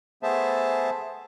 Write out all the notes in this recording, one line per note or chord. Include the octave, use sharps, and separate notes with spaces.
A3 B3 G#4 C5 E5 A5